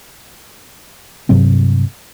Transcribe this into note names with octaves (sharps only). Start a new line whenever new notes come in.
G2 C3 F#3 C4